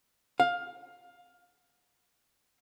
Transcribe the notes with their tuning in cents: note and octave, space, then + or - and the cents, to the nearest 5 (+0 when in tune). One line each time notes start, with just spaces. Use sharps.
F5 +15